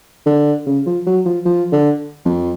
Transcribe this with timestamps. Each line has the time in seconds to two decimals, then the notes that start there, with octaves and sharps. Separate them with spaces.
0.26 D3
0.67 C#3
0.86 F3
1.07 F#3
1.26 F3
1.46 F3
1.72 D3
2.25 F2